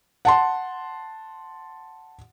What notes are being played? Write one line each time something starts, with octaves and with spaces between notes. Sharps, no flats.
F#5 A5 C6